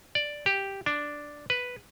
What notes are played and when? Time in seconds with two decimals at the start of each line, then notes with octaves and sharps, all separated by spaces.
0.15 D5
0.46 G4
0.86 D4
1.50 B4